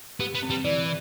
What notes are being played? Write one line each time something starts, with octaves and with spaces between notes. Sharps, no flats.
B3 G4
B3
C4
G3
E3 D5